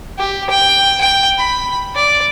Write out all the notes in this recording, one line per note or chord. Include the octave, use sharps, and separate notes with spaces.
G4
G5
G5
B5
D5